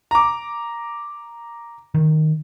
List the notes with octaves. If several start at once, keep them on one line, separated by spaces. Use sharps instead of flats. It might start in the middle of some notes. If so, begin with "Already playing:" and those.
A#5 D6
D#3